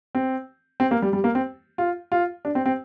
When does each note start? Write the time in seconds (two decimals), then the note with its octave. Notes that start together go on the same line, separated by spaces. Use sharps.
0.15 C4
0.80 C4
0.91 A#3
1.02 G3
1.13 G3
1.24 A#3
1.35 C4
1.78 F4
2.12 F4
2.45 D4
2.55 C4
2.66 C4